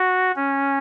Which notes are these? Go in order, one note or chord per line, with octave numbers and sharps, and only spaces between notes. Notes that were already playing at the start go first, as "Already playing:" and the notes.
Already playing: F#4
C#4